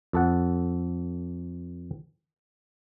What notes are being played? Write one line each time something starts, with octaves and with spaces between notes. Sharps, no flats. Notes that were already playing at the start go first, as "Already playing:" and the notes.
F2 A4 F#5